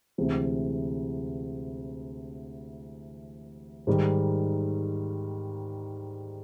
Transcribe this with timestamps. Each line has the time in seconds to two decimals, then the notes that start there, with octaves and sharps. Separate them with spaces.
0.18 D2 C3 E3 G#3
3.87 G#2 D#3 G3